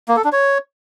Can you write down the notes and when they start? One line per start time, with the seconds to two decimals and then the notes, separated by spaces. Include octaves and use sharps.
0.08 A#3
0.16 A4
0.24 D4
0.32 C#5